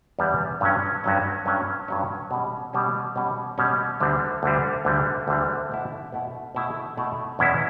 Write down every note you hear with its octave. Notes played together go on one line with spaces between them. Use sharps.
E2 D3 G3 B3
G2 F#3 C#4
G2 F#3 C#4
G2 F#3 C#4
G2 F#3 C#4
B2 G3 C#4
B2 G3 C#4
B2 G3 C#4
B2 G3 C#4
D2 D3 G3
D2 D3 G3
D2 D3 G3
D2 D3 G3
B2 A3 E4
B2 A3 E4
B2 A3 E4
B2 A3 E4
E2 B2 F#3 C#4 E4